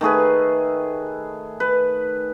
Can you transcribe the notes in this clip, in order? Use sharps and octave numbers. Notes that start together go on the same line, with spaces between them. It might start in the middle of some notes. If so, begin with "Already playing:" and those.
D#3 A3 G#4 B4
B4